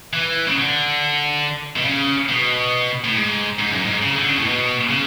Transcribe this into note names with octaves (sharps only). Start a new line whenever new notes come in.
E3
C#3
D3
B2
C#3
B2
A2
G#2
G#2
F#2
G#2
C#3
D3
C#3
A2
B2
C#3